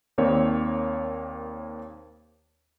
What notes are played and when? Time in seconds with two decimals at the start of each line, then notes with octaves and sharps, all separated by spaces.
0.18 D#2 A#3 C4 C#5 D5